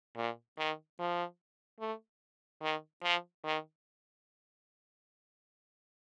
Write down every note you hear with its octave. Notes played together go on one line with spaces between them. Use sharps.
A#2
D#3
F3
A3
D#3
F3
D#3